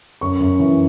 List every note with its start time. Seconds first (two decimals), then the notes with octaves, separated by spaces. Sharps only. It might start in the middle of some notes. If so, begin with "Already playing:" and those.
0.21 F#2 C#6
0.40 F#2
0.60 E3